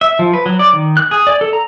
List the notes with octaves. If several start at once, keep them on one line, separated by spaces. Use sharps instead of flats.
E5
F3
B4
F#3
D5
D#3
F#6
G#4
D5
A4
A#5